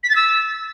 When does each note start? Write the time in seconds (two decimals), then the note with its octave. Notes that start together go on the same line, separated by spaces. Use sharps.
0.04 B6
0.10 A6
0.16 E6